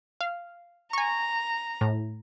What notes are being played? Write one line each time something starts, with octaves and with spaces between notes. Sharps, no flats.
F5
G#5 A#5 C#6
A2